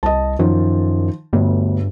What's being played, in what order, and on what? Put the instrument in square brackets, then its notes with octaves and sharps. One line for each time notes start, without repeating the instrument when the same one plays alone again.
[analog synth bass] C2 [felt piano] D#5 A5
[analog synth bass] F#2 [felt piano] D#3 F3
[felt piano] G1 D2 [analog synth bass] G2